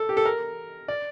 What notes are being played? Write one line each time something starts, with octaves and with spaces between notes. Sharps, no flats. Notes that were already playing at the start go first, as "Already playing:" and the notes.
Already playing: A4
G4
A4
A#4
D5